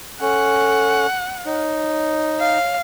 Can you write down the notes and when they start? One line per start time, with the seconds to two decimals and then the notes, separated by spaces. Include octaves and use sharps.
0.21 C#4 A4 F#5
1.46 D#4 C#5
2.40 F5